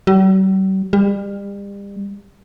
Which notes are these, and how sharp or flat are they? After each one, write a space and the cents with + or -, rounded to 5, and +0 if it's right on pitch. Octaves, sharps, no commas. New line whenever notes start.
G3 -45
G3 +35